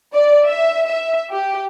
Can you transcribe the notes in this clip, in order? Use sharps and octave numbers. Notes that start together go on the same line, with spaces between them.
D5
E5
E5
G4